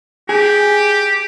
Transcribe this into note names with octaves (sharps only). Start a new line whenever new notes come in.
G4 G#4